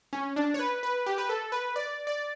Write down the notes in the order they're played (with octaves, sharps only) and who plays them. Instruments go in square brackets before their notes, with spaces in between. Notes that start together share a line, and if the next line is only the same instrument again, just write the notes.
[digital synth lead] C#4
D4
C#5
B4
B4
G4
B4
A4
B4
D5
D5